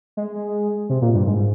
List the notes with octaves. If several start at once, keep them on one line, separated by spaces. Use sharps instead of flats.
G#3
C3
A#2
G2
G#2